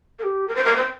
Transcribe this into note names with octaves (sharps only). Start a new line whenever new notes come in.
A#4
G4
A#4
C5
A#4
C5